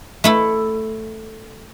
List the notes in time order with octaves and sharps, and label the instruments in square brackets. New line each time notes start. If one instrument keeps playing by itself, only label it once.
[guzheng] A3 E4 A4